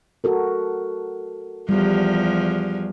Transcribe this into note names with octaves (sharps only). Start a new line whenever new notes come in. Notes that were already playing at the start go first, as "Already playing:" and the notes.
F#4 A4 A#4
E2 F3 G3